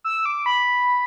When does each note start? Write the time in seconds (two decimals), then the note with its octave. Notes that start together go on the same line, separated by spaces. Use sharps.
0.04 E6
0.26 D6
0.46 B5